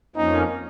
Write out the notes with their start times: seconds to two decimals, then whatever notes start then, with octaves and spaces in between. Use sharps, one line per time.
0.16 F2 F3 A#3 C#4 D#4